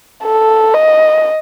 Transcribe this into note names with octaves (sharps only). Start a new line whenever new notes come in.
A4
D#5